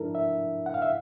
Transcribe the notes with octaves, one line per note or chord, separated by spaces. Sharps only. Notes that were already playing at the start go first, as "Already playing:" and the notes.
Already playing: G#2 F3 G#3 D4 E4 A4 A#4
E5
F#5
F5
E5